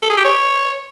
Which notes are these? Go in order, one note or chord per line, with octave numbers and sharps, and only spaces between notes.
A4
G#4
G4
C#5